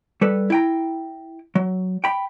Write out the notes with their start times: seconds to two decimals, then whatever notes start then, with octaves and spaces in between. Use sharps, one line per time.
0.21 G3 A4 B4
0.50 E4 G5 A#5
1.55 F#3
2.04 G5 B5